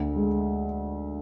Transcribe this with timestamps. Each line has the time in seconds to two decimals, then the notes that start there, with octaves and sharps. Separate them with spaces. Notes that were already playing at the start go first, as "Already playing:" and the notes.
Already playing: D2
0.16 G#3